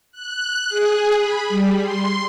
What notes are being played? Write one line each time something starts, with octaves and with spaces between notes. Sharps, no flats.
F#6
G#4
B5
G3
C6